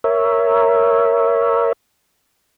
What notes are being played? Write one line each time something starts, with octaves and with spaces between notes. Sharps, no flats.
A#4 C#5 E5